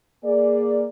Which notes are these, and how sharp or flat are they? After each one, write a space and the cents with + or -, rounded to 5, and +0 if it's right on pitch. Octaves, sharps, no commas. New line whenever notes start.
A#3 +0 G#4 +0 D5 +0